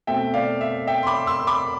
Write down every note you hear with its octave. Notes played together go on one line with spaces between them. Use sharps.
B2 A3 C4 E5 G5
D5 F5
E5
E5 G5
C6
B5 D6
C6 E6
B5 D6